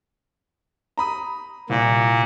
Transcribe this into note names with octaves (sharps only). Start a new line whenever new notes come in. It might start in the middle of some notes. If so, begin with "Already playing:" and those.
A#5 B5 D#6
C2 A#2